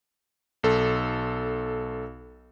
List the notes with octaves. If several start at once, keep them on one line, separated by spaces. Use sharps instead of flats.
B1 A4